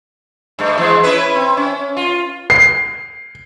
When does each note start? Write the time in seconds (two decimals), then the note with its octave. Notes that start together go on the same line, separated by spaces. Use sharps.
0.59 G2 A3
0.78 E3 G#3
1.03 C#4 E4 B4
1.35 C4
1.57 C#4
1.97 F4
2.50 C7